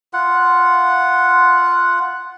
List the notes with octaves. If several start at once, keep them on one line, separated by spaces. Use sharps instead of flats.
F4 F#5